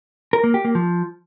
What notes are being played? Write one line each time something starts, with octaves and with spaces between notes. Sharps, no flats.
A#4
A#3
G4
A#3
F3